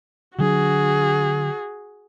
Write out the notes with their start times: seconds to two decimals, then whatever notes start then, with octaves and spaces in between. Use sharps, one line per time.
0.39 D3 F#3 D4 F#4 G#4